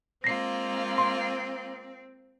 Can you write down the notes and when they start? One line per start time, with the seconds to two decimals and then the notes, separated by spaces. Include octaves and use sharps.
0.24 G#3 A#3 C4 F4 A#6 C7
0.98 C6